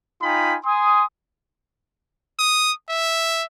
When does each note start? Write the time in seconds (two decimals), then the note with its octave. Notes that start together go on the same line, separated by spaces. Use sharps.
0.22 D#4 F4 G5 G#5 B5
0.65 G#5 C6 D#6
2.39 D#6
2.89 E5